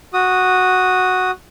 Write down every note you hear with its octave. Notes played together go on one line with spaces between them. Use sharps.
F#4 D#6